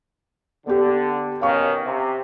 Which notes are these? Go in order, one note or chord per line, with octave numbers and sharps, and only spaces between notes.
D3 B3 G4
B2 D#3 C#4 F5 C#6
C3